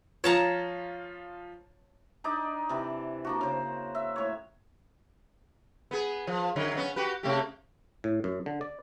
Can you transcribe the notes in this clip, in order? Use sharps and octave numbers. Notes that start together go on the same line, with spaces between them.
F3 F4 C#5 A5 A#5
D4 D#4 D5
C3 E3
A#3 D4 F#4
C#3 C5
E5
A2 C#5
B3 G#4
F3
F#2 D3 F#3
B3 C#4
F#4 G4 B4
C3 A3 G4
A2
F#2
D3
D5